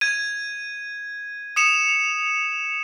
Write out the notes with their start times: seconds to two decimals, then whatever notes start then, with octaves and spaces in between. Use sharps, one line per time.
0.01 G#6 D#7
1.56 D#6 C#7 E7 F7